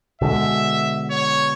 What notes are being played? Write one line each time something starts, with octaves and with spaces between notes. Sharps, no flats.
B2 D3 G#3 E5
C#5